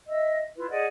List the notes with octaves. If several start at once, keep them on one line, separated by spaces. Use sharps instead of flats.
D#5 E5 E6
E4 F4 B4
G#4 D5 D#5 F#5